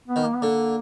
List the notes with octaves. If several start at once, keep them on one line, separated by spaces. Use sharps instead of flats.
B3
D#3
A#3
B3
D3 A#3